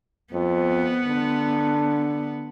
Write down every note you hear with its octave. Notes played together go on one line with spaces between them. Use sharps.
F2 B3
D3